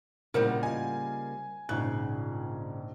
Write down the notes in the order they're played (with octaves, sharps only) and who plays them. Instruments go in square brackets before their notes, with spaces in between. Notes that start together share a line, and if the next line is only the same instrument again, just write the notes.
[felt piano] A#1 A2 [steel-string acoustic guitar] C#3 G3 A#3 [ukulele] A#4 C5 F#5
[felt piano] F4 D#5 [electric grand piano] G#5
[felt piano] A#1 G#2 F#6 [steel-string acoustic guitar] C#3